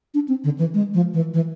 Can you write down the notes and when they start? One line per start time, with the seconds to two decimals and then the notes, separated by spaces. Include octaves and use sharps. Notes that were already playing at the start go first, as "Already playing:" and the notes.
0.14 D4
0.28 C4
0.44 D3
0.58 E3
0.74 G#3
0.94 F3
1.14 E3
1.34 E3